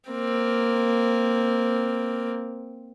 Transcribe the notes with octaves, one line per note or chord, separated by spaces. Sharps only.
A#3 C4